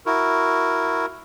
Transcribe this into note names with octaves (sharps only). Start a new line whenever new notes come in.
E4 F#4 A#4